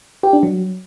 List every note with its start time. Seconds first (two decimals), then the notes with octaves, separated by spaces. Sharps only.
0.23 G4
0.33 D4
0.43 F#3